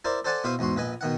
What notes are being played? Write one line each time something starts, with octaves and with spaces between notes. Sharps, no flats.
E4 A#4 C5 D5
A4 C5 D5 F#5 G#5 A5
B2 E4 C5 E5 F5 D#6
E2 G#2 F#4 C6
A#1 B4 D#5 G#5
B2 D#3 F#5